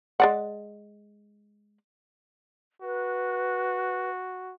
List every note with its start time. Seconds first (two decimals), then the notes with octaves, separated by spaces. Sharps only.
0.20 G#3 D5 F#5
2.82 F#4 B4